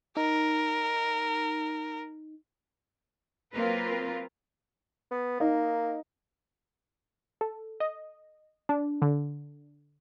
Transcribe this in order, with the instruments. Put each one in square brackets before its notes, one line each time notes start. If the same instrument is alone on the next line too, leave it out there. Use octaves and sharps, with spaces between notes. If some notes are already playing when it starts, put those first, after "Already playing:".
[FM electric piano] D#4 [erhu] A#4
[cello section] F#3 A#3 C4 F4 A#4 B4
[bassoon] B3
[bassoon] A#3 [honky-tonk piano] D#4
[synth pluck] A4
D#5
D4
D3